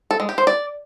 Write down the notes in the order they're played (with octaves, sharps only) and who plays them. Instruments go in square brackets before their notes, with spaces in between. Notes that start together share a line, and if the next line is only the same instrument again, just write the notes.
[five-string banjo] A4
G#3
G4
C5
D5